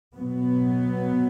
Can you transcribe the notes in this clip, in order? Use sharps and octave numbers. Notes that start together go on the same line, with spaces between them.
B2 F#3 B3